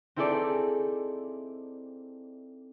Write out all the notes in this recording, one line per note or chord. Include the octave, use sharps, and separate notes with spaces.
C4 D#4 E4 G#4 A4 D5